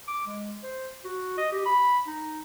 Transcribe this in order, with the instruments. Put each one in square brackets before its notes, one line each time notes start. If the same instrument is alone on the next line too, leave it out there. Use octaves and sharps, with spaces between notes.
[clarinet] D6
G#3
C5
F#4
D#5
G4
B5
D#4